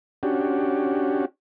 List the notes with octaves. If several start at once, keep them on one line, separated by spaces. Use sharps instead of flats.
C#4 D4 F#4 G4